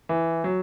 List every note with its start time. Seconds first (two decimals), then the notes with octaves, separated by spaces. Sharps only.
0.09 E3
0.44 F#3